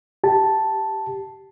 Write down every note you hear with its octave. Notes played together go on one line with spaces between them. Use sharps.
G4 A5